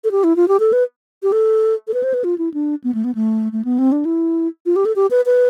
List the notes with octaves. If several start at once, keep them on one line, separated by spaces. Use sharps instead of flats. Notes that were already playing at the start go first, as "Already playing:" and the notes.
A4
G4
E4
F4
G4
A4
B4
G4
A4
A4
B4
C5
B4
F4
E4
D4
B3
A3
B3
A3
A3
B3
C4
D4
E4
F4
G4
A4
G4
B4
B4